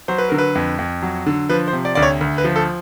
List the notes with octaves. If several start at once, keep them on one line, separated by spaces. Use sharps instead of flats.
F#3 C5
B4
D3 A#4
B4
F2
F2
F#3
D3
F3 B4
C5
C3
D5
D2 D5
C#5
D2
B4
F3
A4